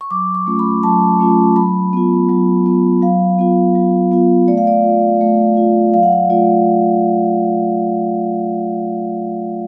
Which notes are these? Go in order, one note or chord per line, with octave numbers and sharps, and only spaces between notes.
C#6
F#3 D6
C#6
A3 C#4 F4
B5
F#3 A5
A3 C#4 F4
F#3 B5
B3 F4
F#3
B3 F4
F#3 F5
B3 F4
F#3
B3 F4
A3 D5
F5
D5
F4
A3
F4
F#3 F5
F#5
F5
A3 F4 D5